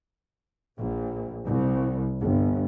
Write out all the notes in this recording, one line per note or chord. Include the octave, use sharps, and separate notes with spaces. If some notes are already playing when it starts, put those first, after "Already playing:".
A#1
C2
G1